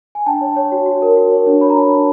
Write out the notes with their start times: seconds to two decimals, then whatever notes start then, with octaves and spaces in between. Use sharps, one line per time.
0.15 G#5
0.26 D4 G5 A5
0.41 C#5
0.56 C#5
0.72 F#4
0.86 F#4
1.02 A#4
1.17 F#4
1.32 C#5
1.47 D4
1.61 C#5 B5
1.70 A#5
1.77 D4 A5 B5
1.93 D4